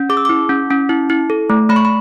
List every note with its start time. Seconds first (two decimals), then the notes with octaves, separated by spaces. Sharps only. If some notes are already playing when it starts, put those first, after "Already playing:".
Already playing: C#4
0.09 G#4 D6
0.17 E6
0.25 E4 D6
0.49 C#4
0.70 C#4
0.89 E4
1.10 E4
1.30 A4
1.50 A3
1.69 A3 B5
1.76 C#6
1.85 B5